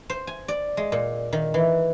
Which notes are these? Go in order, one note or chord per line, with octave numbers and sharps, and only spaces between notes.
C5
G#5
D5
G#3
A#2
D#3
E3